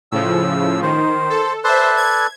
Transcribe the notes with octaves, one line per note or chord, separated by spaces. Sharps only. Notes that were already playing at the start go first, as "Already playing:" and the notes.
A2 C#3 F3 E6
D#3 C5
A4
A4 B4 C5 D5 E5
G#6